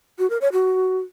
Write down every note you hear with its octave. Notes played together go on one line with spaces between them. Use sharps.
F#4
A#4
C#5
F#4